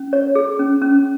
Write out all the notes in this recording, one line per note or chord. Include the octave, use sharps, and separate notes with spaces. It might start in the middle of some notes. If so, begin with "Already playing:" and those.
Already playing: C#4
C#5
G#4
C#4
C#4